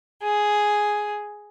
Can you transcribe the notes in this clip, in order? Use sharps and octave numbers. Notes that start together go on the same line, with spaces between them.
G#4